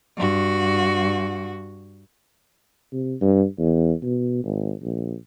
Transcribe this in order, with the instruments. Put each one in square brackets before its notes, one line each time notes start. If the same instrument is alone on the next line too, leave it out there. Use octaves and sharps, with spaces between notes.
[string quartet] G2 F#4
[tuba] C3
G2
E2
B2
G#1
A#1